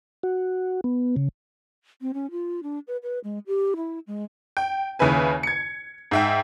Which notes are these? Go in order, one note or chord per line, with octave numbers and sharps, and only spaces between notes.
F#4
B3
C#3
C4
C#4
F4
D4
B4
B4
G#3
G4
E4
G#3
G5
D#2 C#3 E4 B4 G#5
G#6 C#7
G#2 E5 G5